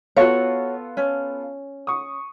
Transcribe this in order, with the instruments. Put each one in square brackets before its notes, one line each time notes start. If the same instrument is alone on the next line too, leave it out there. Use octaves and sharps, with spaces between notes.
[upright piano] B3 F4 A4 [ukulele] F#4 C#5
[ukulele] C#4
[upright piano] C#6 D#6